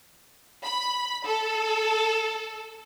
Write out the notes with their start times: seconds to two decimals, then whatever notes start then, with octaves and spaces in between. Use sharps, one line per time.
0.64 B5
1.25 A4